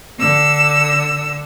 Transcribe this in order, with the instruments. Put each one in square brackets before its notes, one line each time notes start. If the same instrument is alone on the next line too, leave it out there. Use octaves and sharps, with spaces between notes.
[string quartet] D3 E6